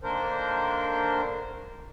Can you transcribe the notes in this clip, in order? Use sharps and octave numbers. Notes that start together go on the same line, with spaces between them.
D3 D#3 A#3 D4 A#4 C5